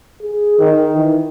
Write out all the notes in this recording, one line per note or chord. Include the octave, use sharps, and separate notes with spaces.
G#4
D#3
E3